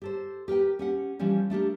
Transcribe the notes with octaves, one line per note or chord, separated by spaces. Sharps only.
G4 A4 C5
G4 A#4 B4 G5
C#4 G4 F#5
E3 F3 G3 C#4 G4
A3 D4 G4 A#4